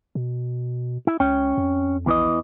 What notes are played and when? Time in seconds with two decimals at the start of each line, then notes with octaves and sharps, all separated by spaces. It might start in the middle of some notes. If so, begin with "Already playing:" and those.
0.15 B2
1.07 E4
1.20 C#2 C#4 G5
1.57 F2
2.06 A#1 E2 E3 D#5